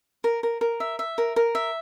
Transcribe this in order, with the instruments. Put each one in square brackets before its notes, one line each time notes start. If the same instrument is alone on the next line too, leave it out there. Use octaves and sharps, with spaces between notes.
[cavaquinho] A#4
A#4
A#4
E5
E5
A#4
A#4
E5